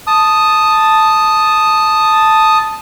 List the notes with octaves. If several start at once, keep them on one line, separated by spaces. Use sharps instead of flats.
A5 D#6